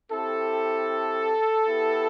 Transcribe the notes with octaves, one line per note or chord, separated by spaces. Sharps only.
C4 E4 G4 A4
B3 E4 G4